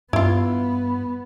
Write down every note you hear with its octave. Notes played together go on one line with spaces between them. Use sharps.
G2 B3 E4 F4